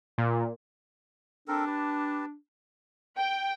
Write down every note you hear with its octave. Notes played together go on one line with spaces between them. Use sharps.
A#2
C4 D4 A4 A#4
G4 B4 A5
G5